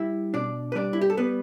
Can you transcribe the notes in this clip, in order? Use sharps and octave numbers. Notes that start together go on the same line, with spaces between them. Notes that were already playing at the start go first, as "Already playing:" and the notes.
Already playing: G3 E4 E5
B2 D4 D5
B4
G3 D4 D5
E4
G4
A4
G3 B3 B4